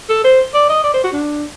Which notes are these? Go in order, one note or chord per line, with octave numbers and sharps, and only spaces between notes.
A4
C5
D5
D#5
D5
C5
F#4
D4